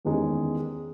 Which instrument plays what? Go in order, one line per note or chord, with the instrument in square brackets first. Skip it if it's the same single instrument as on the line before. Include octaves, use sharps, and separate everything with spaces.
[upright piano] E2 D#3 G#3 C#4